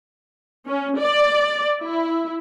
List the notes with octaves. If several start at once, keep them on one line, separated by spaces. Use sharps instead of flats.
C#4
D5
E4